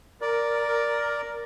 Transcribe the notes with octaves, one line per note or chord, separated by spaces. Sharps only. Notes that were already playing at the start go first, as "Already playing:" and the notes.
A#4 D5